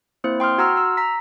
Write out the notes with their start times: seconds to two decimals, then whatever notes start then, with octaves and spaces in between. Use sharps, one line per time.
0.24 A#3 C4 E4 C5
0.40 G5 C6 D#6 F6
0.58 F#4 F#5 A#5 C6 E6 F6
0.77 E6
0.97 A#5 B6